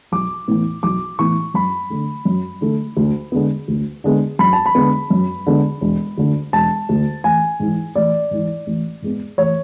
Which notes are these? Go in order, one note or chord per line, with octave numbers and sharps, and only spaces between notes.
B1 D6
A2 E3 B3
B1 D6
A2 E3 B3 C#6
F#2 B5
D3 A3
F#2
D3 A3
D2
D3 G#3 B3
D2
D3 G#3 B3
F#2 B5
A5
B5
D3 G#3 B3
F#2
D3 G#3 B3
E1
D2 D3
E1 A5
D2 D3
A1 G#5
G#2 E3
A1 D5
G#2 E3
A1
G#2 G#3 B3
A1 C#5